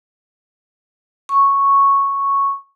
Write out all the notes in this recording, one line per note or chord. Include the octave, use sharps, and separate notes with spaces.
C#6